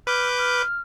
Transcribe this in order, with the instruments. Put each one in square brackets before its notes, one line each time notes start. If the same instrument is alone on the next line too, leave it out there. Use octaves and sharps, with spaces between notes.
[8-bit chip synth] B4 D6 G6 [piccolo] F6
[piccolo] F6